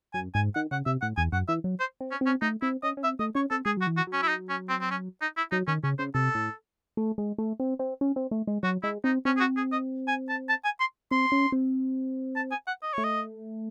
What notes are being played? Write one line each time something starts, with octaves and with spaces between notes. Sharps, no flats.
F#2 G#5
G#2 G#5
D#3 F#5
C#3 F#5
C3 E5
A2 F#5
E2 G#5
F#2 F#5
E3 E5
F#3
C5
C4
C#4
C4 C#4
A3 D#4
C4 E4
C#4 D#5
C#4
C4 E5
A3 D#5
C#4 C#5
C4 A4
G#3 G#4
F#3 F#4
E3
F#4
F#3
C#4
E4
D#4
C#4
C4
C4
C#4
D#4
E4
F#3 D#4
D#3 C#4
C#3 C#4
C#3 C5
C3 A4
A2
A3
G#3
A3
C4
C4
C#4
C4
A3
G#3
F#3 F#4
G#3 E4
C4 D#4
C4 C#4
G#4
F#4
G#4
D#5
G#5
A5
A5
G#5
C6
C4 C6
C#4
C4
A5
G#5
F#5
D#5
A3 C#5
D#5